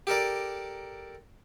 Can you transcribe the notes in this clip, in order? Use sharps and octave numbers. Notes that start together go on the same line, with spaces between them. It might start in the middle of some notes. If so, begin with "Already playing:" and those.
G4 A4 A#4 D5